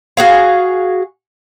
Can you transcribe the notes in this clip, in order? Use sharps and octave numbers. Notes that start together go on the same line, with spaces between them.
F#4 G#4 F5